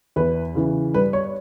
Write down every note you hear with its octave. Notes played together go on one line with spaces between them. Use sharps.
E2 B4
C#3 E3
G2 B4
C#5